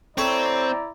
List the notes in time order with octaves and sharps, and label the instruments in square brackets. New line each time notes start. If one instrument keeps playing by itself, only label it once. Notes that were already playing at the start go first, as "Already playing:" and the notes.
[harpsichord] A3 G4 C#5 [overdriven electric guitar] C4 [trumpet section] E4 D5 A#5